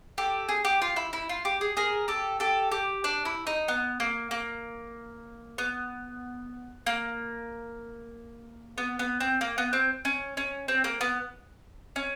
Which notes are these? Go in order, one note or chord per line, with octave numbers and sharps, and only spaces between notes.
G4 A4
G#4
G4
F4
E4
E4
F4
G4
G#4
G#4 A#4
G4 A4
G4 A4
G4
D4
E4
D#4
B3
A#3
A#3
B3
A#3
B3
B3
C4
A#3
B3
C4
C#4
C#4
C4
A#3
B3
C#4